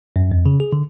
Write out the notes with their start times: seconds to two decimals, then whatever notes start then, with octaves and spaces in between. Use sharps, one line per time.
0.16 F#2
0.31 F2
0.46 C#3
0.60 G#4
0.73 D3